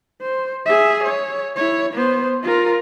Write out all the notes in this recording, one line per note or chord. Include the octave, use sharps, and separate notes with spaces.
C5
G#4 E5
C#5
E4 C#5
B3 C5
F4 A#4